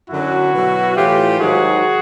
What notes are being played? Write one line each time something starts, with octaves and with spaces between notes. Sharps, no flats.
F#2 D3 F#3 E4 F#4
B2 F#3
A2 E3 F4 G4
G#2 D#3 F#3 F#4 G#4